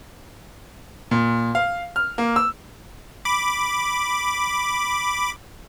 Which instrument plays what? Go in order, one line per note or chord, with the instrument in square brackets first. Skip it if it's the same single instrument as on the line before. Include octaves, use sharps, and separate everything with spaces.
[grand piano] A#2
F5
F6
A#3
E6
[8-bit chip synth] B5 D6